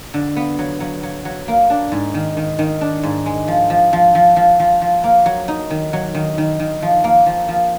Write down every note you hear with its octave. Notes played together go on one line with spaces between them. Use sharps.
D3
B3
F#3
F#3
F#3
F#3
A#3
D4
G#2
D#3
D#3
D#3
D4
G#2
G#3
F3
F3
F3
F3
F3
F3
F3
A#3
F#3
D#4
D#3
F#3
D#3
D#3
D#3
F3
A#3
F3
F3